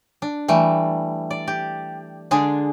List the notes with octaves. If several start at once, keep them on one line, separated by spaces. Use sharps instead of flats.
D4
E3 G3 A3
D5
G4
D3 G#3 D4 G#4